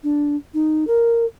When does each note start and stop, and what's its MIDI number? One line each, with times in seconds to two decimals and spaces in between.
0.03 0.36 62
0.54 0.87 63
0.87 1.25 70